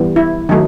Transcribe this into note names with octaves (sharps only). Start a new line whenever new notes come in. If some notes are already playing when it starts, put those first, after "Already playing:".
Already playing: E3 G3 B3
E4
D#3 F#3 A3 D#4